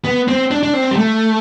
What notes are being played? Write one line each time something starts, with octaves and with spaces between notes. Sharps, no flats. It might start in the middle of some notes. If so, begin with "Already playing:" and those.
B3
C4
D4
D4
C4
G3
A3